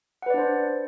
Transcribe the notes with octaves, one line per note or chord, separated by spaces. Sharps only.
D4 B4 C5 D5 F#5